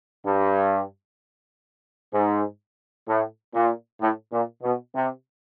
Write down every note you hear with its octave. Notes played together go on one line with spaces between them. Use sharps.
G2
G#2
A2
A#2
A2
A#2
B2
C3